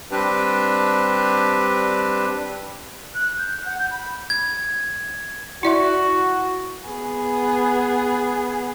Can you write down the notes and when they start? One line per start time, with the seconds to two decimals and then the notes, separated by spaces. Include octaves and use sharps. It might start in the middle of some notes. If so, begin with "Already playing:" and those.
0.11 G3 C4 D4 G4 B4
3.14 F#6
3.38 G6
3.65 F#5
3.78 G6
3.91 B5
4.30 G#6
5.63 E4 F#4 D5 E5
6.89 B3 G#4